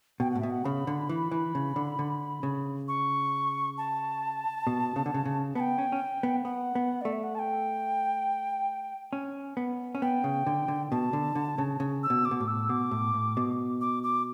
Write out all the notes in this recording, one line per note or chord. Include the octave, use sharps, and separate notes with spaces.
B2 G5
A2 F#5
B2 E5
F#5
C#3 B5
D3
E3
E3
C#3
D3
D3
C#3
C#6
A5
B2
C#3
D3
C#3
C#3
B3 G5 A5
C#4
C#4
B3
B3 F#5
B3
A3 D5
E5
F#5
A5
G5
C#4
B3
C#4
B3 G5
C#3
D3
D3
B2 A5
D3
D3
C#3
C#3
E6
B2
D6
B2
A2
E6
B2 D6
A2
A2
B2
D6
D6